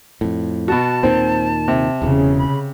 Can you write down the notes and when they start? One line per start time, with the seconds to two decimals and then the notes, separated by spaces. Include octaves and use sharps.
0.21 F2 A2
0.68 B2 F#4 A5
1.03 D#2 A#2 D#3 C4
1.68 C3
2.02 E1 E2 C#3
2.38 B5